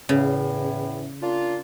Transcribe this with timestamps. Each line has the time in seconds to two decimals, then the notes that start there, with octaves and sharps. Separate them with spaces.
0.09 E2 A2 C#3
1.23 A#3 D4 F4